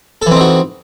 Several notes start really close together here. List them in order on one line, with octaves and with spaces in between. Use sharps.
A4 E3 C4 D#4 F#4